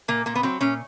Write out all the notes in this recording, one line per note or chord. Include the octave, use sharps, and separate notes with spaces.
A#2 A#3
A#2 A#3
B3
F#3 C4
A#2 C#4